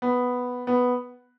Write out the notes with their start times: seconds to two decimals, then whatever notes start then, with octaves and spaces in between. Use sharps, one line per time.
0.02 B3
0.67 B3